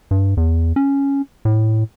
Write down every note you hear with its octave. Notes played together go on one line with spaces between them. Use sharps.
G2
E2
C#4
A2